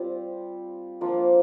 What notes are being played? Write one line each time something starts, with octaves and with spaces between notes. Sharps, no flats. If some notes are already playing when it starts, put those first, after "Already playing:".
Already playing: G3 C4 F4
F3 A#3 D4 F4